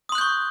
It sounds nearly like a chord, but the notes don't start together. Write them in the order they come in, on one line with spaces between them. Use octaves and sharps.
D#6 C6 F#6 G6 C#6